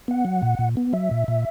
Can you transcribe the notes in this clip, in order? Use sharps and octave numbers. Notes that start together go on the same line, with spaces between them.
B3 F#5
F#3
A#2
A#2
B3
F#3 E5
A#2
A#2